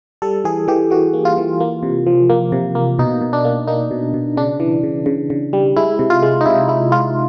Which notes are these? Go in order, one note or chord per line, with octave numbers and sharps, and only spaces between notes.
G3 A4
E3 G#4
E3 G4
E3 F#4
A#3
F4
E3
A#3
C3
F3
A#3
C3
A#3
B2 D#4
B2
D4
A#3
A#3 D#4
B2
B2
C#3 D4
E3
C#3
C#3
C#3
G3
G#3 E4
C3
F4
G#3
D#4
C3 E4
G#3 E4
G#3 F4